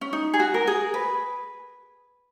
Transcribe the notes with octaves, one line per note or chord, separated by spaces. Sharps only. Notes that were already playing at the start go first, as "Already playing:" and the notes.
C#4
D#4
G#4
F#4
A#4
G#4
B4